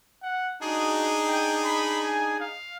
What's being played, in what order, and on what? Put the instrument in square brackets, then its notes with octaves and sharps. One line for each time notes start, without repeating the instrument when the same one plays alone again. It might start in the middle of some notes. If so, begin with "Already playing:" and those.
[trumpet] F#5
[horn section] D4 D#4 G#4 [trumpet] F#4
[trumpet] G5
B5
G#5
F5